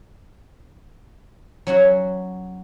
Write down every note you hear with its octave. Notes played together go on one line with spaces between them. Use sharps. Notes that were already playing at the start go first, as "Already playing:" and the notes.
F#3 C#4 F#4 E5